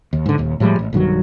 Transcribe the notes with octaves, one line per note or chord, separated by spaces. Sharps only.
D#2
G#2 D3
D#1 D#2
A2 F3 G3 G#3
A1
B1 G2 D#3 F#3